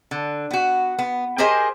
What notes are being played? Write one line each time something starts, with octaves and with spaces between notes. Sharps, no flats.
D3
B3 F#4
B3
G4 G#4 A#4 C5 D#5 G#5